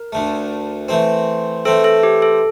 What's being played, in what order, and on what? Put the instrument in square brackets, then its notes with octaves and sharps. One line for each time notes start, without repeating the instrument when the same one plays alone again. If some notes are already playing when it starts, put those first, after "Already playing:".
Already playing: [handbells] A#4
[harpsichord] D2 D3 A3
E3 A3 C4
[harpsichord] E3 A3 C4 [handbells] A4
[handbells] A4
G4
A4